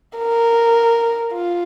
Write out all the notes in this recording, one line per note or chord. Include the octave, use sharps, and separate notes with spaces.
A#4
F4